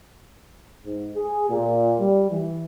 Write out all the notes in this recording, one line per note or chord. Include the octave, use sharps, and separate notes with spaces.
G#2
G#4
A#2
G3
E3